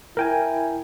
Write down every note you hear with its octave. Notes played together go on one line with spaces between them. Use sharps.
E4 A#4 G5 G#5